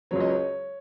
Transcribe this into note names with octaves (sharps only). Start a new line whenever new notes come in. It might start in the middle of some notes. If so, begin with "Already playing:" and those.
C#2 C#3 F#3 C#5
D#5
C#5